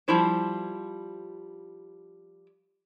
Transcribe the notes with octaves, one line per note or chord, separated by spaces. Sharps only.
F3 G3 E4 C5